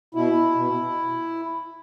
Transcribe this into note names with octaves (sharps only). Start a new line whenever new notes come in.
B2 E4
B2